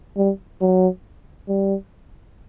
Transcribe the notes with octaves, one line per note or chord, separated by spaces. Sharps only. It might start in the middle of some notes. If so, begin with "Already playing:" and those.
G3
F#3
G3